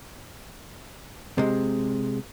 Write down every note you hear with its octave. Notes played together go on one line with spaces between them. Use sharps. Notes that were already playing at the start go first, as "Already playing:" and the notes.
C3 G#3